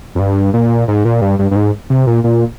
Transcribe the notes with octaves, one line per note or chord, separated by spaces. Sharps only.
F2
G2
A#2
G#2
A#2
G2
G2
G2
G#2
C3
A#2
A#2